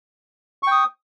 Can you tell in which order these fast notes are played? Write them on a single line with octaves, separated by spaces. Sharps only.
C#6 G5 D#6